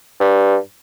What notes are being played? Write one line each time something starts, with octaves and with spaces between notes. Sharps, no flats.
G2